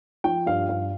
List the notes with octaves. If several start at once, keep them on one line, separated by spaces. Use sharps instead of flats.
F3 G5
G2 F5
G2 F5